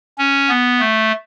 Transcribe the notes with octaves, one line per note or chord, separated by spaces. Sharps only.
C#4
B3
A3